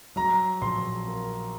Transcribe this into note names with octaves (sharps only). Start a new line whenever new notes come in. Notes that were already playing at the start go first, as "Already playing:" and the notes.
F#3 A#5
A#1 C6
A#3